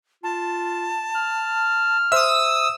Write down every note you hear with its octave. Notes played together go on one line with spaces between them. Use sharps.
F4 A5
F6
C5 E5 D#6 E6